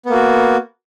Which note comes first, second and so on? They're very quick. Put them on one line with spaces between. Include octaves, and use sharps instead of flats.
B3 A#3 F#4